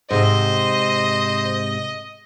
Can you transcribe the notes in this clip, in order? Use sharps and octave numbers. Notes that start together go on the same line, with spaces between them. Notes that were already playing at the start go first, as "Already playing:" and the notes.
G#2 C3 C5 D#5